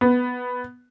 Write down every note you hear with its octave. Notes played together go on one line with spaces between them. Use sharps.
B3